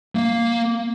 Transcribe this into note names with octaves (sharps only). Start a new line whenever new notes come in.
A#3